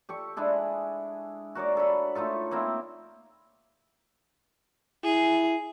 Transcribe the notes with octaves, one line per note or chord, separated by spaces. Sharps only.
G4 A4 C#6
G#3 D4 E4 G#4
F#4 A#4 C#5 D5
D4 A4 C#5 B5
A3 D#4 F4 A4
A#3 C4 E4
E4 G#4